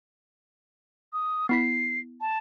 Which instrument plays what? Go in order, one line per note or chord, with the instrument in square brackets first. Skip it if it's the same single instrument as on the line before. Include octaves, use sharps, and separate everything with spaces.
[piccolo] D#6
[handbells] B3 E4 B6 [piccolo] C7
[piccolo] A5